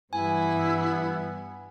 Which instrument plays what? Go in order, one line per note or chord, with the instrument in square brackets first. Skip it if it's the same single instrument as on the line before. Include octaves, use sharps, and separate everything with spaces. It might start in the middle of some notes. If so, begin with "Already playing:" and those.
[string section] G2 E3 [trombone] B3 [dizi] E4 [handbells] G#5